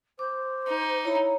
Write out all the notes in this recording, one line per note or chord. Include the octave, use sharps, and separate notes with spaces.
C5 D6
D#4
E4 C#5 A#5